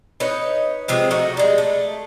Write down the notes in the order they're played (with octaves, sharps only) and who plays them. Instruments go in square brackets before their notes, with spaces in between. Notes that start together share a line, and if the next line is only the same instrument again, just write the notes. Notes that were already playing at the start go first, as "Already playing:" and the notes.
[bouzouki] D#4 B4 C#5
C3 F3 G#3 G4
A3 D#4 F#4
G3 G#3
A3